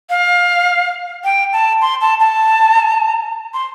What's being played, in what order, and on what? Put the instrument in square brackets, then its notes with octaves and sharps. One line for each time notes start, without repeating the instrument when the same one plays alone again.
[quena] F5
G5
A5
C6
A5
A5
C6